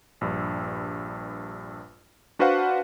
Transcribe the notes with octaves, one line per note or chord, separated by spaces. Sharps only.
A#1 G2
D4 F#4 B4 C5 F5 F#5